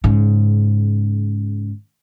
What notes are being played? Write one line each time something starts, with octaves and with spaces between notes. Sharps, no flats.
G#2 C#3